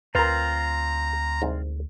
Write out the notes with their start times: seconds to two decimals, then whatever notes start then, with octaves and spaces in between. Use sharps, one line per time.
0.15 D2 C4 F4 A#4 B4 A#5
1.42 C2 G#2